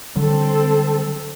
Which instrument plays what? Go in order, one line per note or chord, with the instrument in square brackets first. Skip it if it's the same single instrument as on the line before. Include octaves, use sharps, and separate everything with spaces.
[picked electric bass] D3 F#3 G3 [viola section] C4 A4